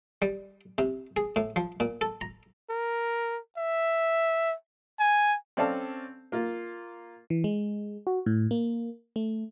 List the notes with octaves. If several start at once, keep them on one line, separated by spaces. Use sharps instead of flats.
G3
C3
G#4
A2
F3
A#2
A4
A#5
A#4
E5
G#5
C4 C#4 A4 D5 F5 A5
A#3 F4
E3
G#3
F#4
A2
A#3
A3